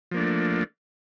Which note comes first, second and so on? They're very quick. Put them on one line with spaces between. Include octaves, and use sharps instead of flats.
F3 A#3 D4 A3